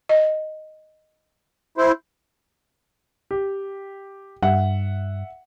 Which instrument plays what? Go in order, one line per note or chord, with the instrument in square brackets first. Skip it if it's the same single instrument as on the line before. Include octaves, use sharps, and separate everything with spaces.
[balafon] D#5
[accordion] E4 C5
[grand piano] G4
[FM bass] G2 [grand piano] E5 F#5